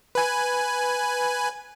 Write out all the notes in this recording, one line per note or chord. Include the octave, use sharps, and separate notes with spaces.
B4 G#5